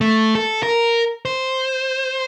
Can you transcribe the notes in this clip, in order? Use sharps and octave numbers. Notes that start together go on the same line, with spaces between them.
A3
A4
A#4
C5